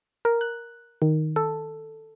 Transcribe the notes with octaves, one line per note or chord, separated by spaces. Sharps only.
A#4
F#6
D#3
A4